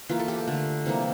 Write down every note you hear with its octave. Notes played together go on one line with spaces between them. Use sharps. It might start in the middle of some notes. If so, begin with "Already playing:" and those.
E3 A#3 F4
A4
G4
A4
D3 A3
C3 E3 G3 A#3